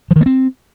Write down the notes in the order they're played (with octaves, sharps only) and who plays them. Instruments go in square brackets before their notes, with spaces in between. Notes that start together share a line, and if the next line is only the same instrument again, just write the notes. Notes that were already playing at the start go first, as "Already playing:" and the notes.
[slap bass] F3
D#3
A#3
C4